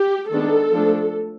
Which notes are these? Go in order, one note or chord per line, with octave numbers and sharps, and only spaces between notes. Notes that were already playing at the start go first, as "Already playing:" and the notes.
Already playing: G4
D#3 G#3 B3 D4 A4
F3 A3 D4